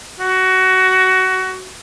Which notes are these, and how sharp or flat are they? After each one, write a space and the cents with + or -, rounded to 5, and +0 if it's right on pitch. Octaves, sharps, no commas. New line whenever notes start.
F#4 +20